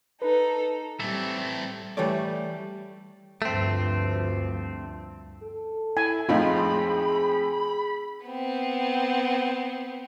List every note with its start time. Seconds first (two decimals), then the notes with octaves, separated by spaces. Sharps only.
0.22 D#4 A4 B4
1.00 A2 E3 G3 A3 C4 A4
1.97 E3 G3 A3 A4 C#5 D5
3.42 D2 G2 F3 A3 C4
5.43 A4
5.97 E4 G#5
6.29 F2 A2 C4 D#4 F4 G#4 B5
8.26 B3 C4